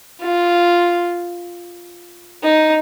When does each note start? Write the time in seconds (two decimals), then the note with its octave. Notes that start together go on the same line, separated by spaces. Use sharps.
0.22 F4
2.43 D#4